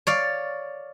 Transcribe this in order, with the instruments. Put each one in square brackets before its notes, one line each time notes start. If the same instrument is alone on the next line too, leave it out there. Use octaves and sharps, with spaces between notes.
[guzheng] C#5 D5 F5